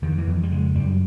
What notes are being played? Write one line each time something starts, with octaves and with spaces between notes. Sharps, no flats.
F2 D#3
E3
F2
G3
C#3 G#3
F#2 G3